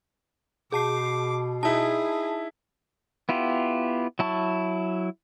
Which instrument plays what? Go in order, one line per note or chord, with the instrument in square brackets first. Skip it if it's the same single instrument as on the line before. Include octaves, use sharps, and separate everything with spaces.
[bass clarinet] B2 [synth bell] G#4 A5 C7 [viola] D6
[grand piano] D#4 E4 [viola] G#4 [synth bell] A5
[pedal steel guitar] B3 E4 F4 G4
F#3 E4 A5 C#6